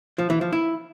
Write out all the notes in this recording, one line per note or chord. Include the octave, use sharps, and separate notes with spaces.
F3
E3
F3
E4